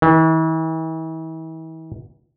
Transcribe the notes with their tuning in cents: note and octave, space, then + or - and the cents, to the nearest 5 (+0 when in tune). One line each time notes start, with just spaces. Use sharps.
E3 -40